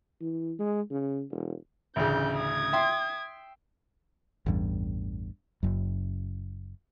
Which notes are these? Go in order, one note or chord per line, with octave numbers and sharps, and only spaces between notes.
E3
G#3
C#3
E1
A1 D2 C#3 G6
D#6 G#6
E5 G5 C6
A1 E2 G2
F#1 F#2